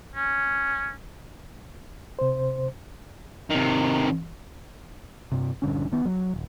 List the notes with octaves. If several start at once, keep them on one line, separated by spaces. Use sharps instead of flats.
C#4
C3 C5
C3 D#3
G2 C3
A#1 G2 D3 C#4
D#3 B3
F#3
D#1